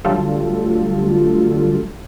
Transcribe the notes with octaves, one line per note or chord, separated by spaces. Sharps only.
D3 F#3 G3 A3 F4 A4